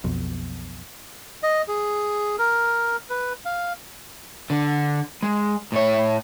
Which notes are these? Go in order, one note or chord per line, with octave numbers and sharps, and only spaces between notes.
B1 F2 B2
D#5
G#4
A#4
B4
F5
D3
G#3
A2 C#5